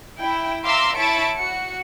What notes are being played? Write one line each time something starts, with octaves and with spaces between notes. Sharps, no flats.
E4 G5
E5 F5 A#5 C6 D6 E6
E4 C#5 E5 A5 C#6 D7
F#4 C#7